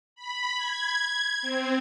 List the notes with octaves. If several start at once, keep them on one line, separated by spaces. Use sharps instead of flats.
B5
G#6
C4